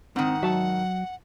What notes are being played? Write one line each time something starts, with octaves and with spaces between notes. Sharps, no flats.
G#2 D#3 C4 F#5
F#3 E5 A5